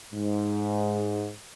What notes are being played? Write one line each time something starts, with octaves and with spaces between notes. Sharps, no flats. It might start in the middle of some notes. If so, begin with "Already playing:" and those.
G#2